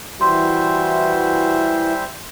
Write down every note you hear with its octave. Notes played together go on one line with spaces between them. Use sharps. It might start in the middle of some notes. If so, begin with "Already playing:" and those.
E3 G3 F#4 C5 E5 C6